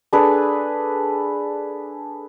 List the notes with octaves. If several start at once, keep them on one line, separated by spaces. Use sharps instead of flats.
D4 G#4 A4 B4